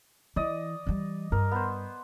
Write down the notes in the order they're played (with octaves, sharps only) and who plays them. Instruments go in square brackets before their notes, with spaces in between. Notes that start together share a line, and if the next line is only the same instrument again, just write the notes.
[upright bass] E3 [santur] D5 D#5
[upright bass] E3 G3
[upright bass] G2 [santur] A#4
[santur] B3 C5